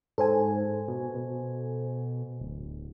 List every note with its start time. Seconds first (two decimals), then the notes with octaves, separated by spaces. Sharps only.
0.18 G#2 A4 C5 G#5
0.88 B2
1.15 B2
2.41 D1